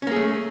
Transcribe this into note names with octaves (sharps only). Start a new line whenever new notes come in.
A3 A#3 C#4 G#4